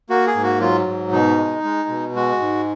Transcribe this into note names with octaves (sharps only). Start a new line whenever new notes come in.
A#3 F#4
G#4
G#2
F#4
F#3 F4
G#2
B2 D#4
G#3
G#3
B2
G#3 F#4
G#2